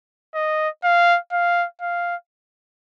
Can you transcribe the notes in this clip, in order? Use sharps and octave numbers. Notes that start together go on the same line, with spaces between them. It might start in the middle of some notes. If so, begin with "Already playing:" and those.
D#5
F5
F5
F5